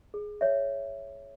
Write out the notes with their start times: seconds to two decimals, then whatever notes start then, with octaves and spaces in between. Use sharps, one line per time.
0.14 G#4
0.41 C#5 E5